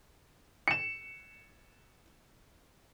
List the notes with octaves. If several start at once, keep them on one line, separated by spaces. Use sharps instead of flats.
C#7 E7